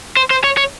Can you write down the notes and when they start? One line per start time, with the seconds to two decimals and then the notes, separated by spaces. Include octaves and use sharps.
0.17 C5
0.30 C5
0.44 C#5
0.57 C#5